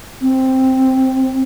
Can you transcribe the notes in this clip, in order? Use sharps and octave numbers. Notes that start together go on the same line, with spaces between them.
C4